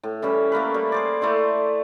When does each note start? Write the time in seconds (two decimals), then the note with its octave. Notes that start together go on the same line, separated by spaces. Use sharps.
0.03 A2
0.22 E3 G3 C#4
0.52 A3 A#3 A#4 B4
0.74 G3
0.92 G#4 C5 D5
1.21 A3 E4 C5 D5